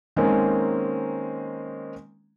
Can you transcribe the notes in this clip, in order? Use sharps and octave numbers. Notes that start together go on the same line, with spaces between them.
D#3 G#3 A#3 C4 C#4